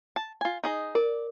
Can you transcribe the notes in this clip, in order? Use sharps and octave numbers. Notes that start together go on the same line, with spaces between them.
A5
F4 G#5
D#4 G#4 D#5
A#4 D5